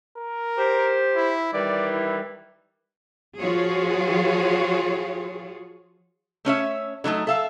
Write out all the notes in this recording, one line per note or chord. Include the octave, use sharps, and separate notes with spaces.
A#4
G4 C5
E4
D#3 E3 G3 D5
E4
F3 F4 F#4 G#4 C#5
A3 C#4 C#5 E5
D3 F#3 A3 D#4
A4 E5 F5